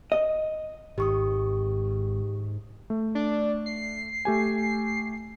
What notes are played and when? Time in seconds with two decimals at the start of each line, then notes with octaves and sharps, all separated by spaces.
0.12 D#5
0.98 G#1 G#2 G4 C#6 D#6
2.90 A3
3.15 D4
3.66 C7
4.25 A3 G4 G#5